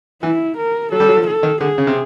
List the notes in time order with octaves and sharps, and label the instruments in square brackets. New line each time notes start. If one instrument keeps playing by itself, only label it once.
[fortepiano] E3 [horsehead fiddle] E4
[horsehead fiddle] A#4
[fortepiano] F#3 [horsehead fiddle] A4
[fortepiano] G3
F#3
F3
[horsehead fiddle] A4
[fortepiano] D#3
[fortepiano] D3 [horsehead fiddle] G#4
[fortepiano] C#3
C3